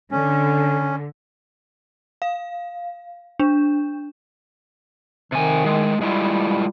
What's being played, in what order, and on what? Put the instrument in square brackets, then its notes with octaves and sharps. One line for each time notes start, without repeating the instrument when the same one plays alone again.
[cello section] D3 [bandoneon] C#4
[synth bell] F5
D4
[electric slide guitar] C3 G#5 [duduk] D#3
[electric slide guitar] A2 G#3
[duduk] G3 [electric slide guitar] G#3 E4 F4